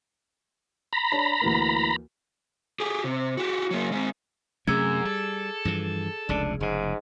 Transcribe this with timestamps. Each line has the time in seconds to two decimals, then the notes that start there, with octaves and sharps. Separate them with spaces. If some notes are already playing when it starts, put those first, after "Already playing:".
0.93 A#5 B5
1.12 D4 C#5 A5
1.42 D2 E3 A#3
2.80 G4 G#4
3.04 C3
3.37 F#4 G4
3.71 F#3 A#3
3.92 G#3 C4
4.68 F#2 C3 A3 C#4 G#4 E6 G#6
5.05 G3 A4
5.65 G2 E3 F3
6.29 F1 C#2 C3 D4
6.60 F1 G#2 C#3